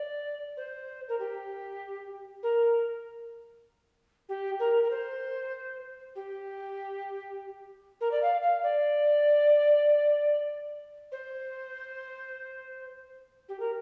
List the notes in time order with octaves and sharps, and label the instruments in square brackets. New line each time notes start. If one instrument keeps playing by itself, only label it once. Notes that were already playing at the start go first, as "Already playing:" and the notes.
Already playing: [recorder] D5
C5
A#4
G4
A#4
G4
A#4
A#4
C5
G4
A#4
D5
F5
F5
D5
C5
G4
A#4